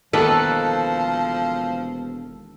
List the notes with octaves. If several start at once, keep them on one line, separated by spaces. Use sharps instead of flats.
E1 D#3 F3 A#3 A4 B4